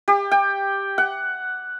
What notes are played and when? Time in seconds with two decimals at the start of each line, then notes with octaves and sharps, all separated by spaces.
0.08 G4
0.31 G5
0.98 F#5